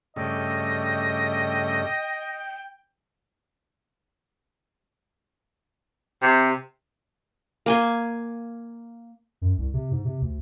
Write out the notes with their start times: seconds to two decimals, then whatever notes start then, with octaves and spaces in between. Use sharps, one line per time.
0.16 G2 C#3 A3 D#5 G5
6.23 C3
7.66 A#3 G#5 C6
9.42 F#2
9.58 C2
9.74 C3
9.92 G#2
10.05 C3
10.22 D2